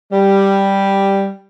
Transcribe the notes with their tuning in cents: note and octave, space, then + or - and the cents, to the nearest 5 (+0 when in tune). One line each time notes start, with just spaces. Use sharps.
G3 +0